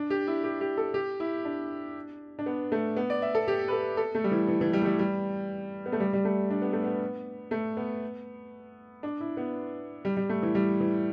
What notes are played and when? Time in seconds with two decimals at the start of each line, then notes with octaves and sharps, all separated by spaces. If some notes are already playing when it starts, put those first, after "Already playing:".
Already playing: D4
0.10 G4
0.27 E4
0.44 G4
0.61 G4
0.77 A4
0.94 G4
1.20 E4
1.45 D4
2.39 D4
2.46 B3
2.72 A3
2.97 B3
3.10 D5
3.22 E5
3.35 A4
3.48 G4
3.68 B4
3.72 A4
3.97 A4
4.15 A3
4.24 G3
4.31 E3
4.48 E3
4.61 E3
4.73 G3
4.82 A3
4.86 G3
4.99 G3
5.86 B3
5.92 A3
6.00 G3
6.13 G3
6.25 A3
6.50 D4
6.62 B3
6.73 A3
6.84 B3
7.51 A3
7.77 B3
9.03 D4
9.20 E4
9.37 B3
10.05 G3
10.17 G3
10.29 A3
10.42 E3
10.55 G3
10.80 E3